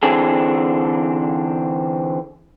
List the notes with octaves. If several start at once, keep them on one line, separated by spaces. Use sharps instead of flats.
D3 E3 C4 D4 G#4 A4